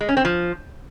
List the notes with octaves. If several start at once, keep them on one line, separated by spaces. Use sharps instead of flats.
G#3
C#4
C4
F3